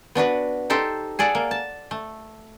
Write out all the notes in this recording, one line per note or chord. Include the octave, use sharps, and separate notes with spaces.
B3 D4 F#4 B4
D#4 G4 A4 C5
G#4 A4 D5 F#5
A#3
A5
A3